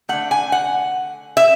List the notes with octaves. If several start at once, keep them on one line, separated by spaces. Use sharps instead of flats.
D3 A3 F#5
G#5
F#5
E5